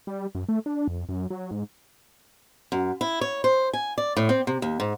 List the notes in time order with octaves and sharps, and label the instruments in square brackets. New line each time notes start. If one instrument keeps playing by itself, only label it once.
[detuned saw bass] G3
F#2
A3
D4
F2
F#2
F#3
G#2
[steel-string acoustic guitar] F#2
E4
C#5
C5
G#5
D5
A2
C4
C3
D#2
G#2